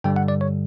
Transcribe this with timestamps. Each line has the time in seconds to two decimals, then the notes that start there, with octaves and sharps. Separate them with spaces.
0.04 G2 D3 G3 G5
0.16 F#5
0.28 D5
0.41 C#5